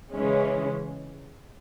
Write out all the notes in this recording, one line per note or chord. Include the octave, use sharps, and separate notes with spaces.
C#3 E3 G#3 C#4